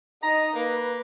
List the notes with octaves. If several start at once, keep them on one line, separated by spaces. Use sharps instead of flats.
D#4 D#5 A#5
A#3 B4